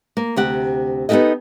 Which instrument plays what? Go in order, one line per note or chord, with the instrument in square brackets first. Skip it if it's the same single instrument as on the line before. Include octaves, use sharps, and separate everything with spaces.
[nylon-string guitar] A#3
D2 C3 G4 F#5
B3 D#4 F4 G4 A4 D#5